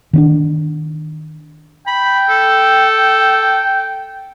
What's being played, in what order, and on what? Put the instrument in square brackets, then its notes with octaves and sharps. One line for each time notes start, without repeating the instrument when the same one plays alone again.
[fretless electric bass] D#3 C4 D4
[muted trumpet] G5 [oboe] B5
[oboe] A4